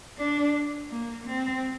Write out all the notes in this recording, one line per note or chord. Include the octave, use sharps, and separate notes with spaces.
D4
A#3
C4